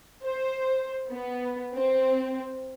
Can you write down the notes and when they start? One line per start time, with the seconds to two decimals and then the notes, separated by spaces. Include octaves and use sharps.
0.24 C5
1.10 B3
1.75 C4